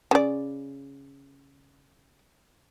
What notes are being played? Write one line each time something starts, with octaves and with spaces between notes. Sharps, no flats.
C#3 D5